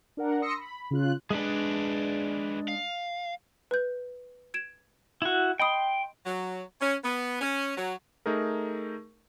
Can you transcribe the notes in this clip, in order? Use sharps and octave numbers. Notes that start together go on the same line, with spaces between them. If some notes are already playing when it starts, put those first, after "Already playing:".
D4 A#4 F#5
C6 D#6 E6 A#6 C#7
B5
C#3 F4 F#6
G#3 D4 G#4 B4 D5
F5
B4 G6
G#6 D7 E7
E4 F#4
D#5 G5 B5 C6 D#6
F#3
C#4
B3
C#4
F#3
A3 D#4 G#4 A#4